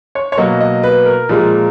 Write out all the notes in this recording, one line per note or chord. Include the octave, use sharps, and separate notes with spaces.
C#5
C#5
B2 F#3 A#3 D#5
D#5
B4
A#4
A#2 F3 G#3